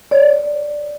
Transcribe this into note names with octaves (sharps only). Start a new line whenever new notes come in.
C#5 D5